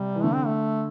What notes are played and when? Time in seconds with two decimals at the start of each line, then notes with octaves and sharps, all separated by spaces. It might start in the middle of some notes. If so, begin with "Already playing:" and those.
Already playing: C3 G3
0.15 E3
0.24 D3 A3
0.34 C4
0.46 A3